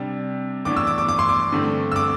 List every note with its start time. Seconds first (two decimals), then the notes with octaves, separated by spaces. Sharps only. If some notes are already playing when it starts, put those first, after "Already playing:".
Already playing: C3 G3 D4
0.65 A2 E3 B3 D4 D6
0.76 E6
0.87 D6
0.98 D6
1.08 D6
1.19 C6
1.29 D6
1.52 G2 D3 A3 C4
1.92 E6
1.96 D6